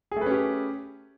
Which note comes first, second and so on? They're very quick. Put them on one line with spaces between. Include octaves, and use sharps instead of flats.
G#4 A3 B4 C#4 G4